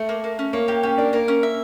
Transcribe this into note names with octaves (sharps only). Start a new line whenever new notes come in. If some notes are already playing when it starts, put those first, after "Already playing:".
Already playing: A3
A#3
A#3
C#4
A#3 C#5
A#3 G4
C#4 G4
D4 A#4
A#3 A#4
C#4
E5